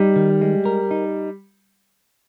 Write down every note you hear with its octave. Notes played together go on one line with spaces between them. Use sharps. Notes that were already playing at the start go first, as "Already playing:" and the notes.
Already playing: G3 D#4
D#3
G#3
A#4
D#4